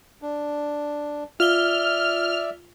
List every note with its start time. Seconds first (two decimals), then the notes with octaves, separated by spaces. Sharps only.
0.22 D4
1.40 F4 D5 E5 F6 F7 G7